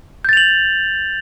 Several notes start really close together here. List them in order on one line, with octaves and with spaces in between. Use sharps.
G6 A6 F7 F#7